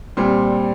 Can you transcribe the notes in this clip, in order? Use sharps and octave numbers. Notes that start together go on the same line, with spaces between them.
A#2 G3 C4 C6